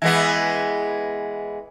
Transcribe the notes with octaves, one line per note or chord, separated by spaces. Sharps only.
E3 G#3 B3